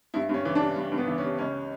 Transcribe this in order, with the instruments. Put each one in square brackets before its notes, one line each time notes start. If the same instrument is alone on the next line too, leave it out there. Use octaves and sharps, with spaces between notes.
[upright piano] G2 E4
G2 C#4
E3
D4
G3
G2
G2
B3
E3
C#4
G3
C#2 C#4